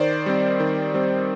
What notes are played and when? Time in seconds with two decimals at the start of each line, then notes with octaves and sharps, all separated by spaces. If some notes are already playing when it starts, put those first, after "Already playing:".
Already playing: D#3 C5 D5
0.26 G3 C4
0.60 D#3
0.94 G3 C4